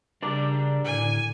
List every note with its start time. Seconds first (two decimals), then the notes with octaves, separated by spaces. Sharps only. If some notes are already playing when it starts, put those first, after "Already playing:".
0.22 C#3 G3 D4 A#4 D5
0.85 A2 D3 G#5